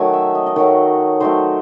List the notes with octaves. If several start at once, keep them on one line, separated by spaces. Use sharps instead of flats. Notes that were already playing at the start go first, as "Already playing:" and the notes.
Already playing: D#3 F#3 A3 G#5
E5
D#5
D#5
D#3 F#3 A3 C#5
D#3 F#3 A3 C5